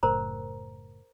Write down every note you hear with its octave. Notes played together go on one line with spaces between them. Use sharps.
F#1 A2 C#3 A#4 C5 A#5